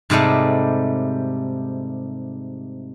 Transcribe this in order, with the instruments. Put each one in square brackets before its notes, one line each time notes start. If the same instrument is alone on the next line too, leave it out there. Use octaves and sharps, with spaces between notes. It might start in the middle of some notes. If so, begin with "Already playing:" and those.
[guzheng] G#2 C3 G3 A3